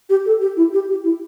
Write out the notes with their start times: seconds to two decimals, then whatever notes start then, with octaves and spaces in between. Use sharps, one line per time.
0.09 G4
0.26 A4
0.41 G4
0.57 E4
0.73 G4
0.89 G4
1.04 E4